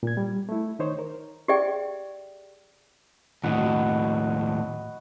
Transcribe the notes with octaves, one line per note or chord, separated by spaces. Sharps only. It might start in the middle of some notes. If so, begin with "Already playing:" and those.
A#2 G#6
G3
A3 E4
D#3 D#4 C5 C#5
A#4
G4 G#4 D5 E5 G5
D#2 A2 F#4 B4 D#5